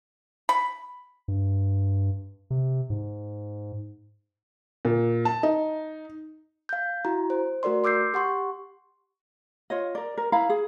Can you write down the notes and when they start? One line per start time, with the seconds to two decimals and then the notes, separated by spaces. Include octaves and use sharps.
0.49 B5
1.28 G2
2.50 C3
2.90 G#2
4.85 A#2
5.25 A5
5.43 D#4
6.69 F5 G6
7.05 E4 F#4 A#5
7.30 C5
7.63 A3 F#4 A#4 D5 C6
7.84 C6 D6 E6 G6 C7
8.14 G4 F#5 C6 C#6
9.70 F4 C#5 D#5
9.95 A#4 D5
10.17 A#4
10.32 E4 F5 A#5 B5
10.49 G#4